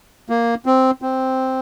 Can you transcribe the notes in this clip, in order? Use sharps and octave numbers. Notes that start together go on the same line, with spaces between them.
A#3
C4
C4